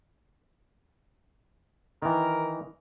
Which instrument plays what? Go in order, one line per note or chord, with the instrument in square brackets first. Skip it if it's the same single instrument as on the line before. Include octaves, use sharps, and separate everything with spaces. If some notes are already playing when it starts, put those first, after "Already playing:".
[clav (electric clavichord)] D#3 E3 [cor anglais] A#4